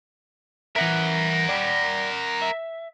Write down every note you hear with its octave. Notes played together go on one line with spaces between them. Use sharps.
E3 A#4 E5 F#5
D5 G5
E5